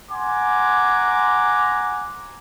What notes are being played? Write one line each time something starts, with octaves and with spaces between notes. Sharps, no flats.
F#5 G#5 A#5 C6 D6